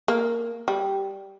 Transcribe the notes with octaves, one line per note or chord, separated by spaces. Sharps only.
A#3
G3